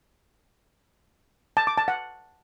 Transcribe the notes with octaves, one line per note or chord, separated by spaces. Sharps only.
A5
D6
A5
F#5